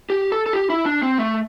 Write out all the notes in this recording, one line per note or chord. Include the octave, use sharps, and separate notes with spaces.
G4
A4
A4
G4
E4
D4
C4
A3